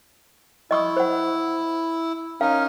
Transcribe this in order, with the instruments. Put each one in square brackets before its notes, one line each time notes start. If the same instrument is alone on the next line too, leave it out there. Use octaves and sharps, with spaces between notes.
[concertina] E4 [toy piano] D#5 C#6 D#6
[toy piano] C5 F#5
[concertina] C#4 D#4 A#4 [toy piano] F5